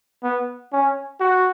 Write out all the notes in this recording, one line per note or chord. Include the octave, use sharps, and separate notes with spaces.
B3
C#4
F#4